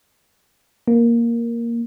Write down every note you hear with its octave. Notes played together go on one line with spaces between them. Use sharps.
A#3